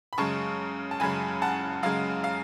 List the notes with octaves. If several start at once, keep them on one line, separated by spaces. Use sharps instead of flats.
B5
F#2 C#3 G#3 A5 C#6
A5
F#2 C#3 G#3 G#5 B5
F#5 A5
F#2 C#3 G#3 F5
F5